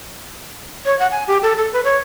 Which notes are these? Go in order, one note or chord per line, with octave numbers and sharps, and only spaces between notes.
C#5
F#5
G#5
G4
A4
A4
B4
C#5